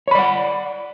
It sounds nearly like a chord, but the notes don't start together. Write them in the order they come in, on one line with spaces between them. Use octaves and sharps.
C#5 B5 D5 F#5